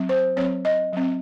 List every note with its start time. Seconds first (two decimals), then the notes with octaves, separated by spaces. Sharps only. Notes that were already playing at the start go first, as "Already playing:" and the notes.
Already playing: F#3 C4
0.09 C5
0.36 F#3 C4 C#5
0.65 D#5
0.93 F#3 C4